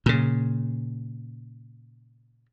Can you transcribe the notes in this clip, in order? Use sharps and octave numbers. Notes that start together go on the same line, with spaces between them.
A#2 C#3